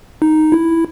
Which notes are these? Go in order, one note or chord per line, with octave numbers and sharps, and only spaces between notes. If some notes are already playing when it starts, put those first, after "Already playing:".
D#4
E4